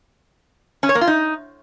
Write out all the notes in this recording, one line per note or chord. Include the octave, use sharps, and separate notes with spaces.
C#4
C#5
A#3
F4
D#4